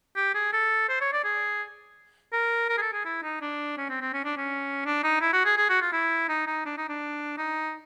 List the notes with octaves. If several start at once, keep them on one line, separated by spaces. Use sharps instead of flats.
G4
G#4
A4
C5
C#5
D5
G#4
A#4
A#4
G#4
A4
G#4
E4
D#4
D4
C#4
C4
C4
C#4
D4
C#4
D4
D#4
E4
F#4
G#4
G#4
F#4
F4
E4
D#4
D#4
D4
D#4
D4
D#4